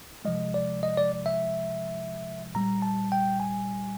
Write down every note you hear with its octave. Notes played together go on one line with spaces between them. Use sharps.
C3 F3 G#3 D#5
D5
D#5
D5
E5
A#2 G3 A#5
A5
G5
G#5